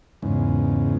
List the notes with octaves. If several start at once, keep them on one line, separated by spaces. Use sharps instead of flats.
E2 G#2 C#3